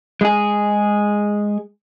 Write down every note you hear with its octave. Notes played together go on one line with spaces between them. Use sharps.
G#3 G#4